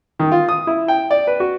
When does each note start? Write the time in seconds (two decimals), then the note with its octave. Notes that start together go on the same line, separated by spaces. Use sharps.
0.19 D#3
0.32 F4
0.49 D#6
0.67 E4
0.88 G5
1.11 D5
1.27 B4
1.40 F#4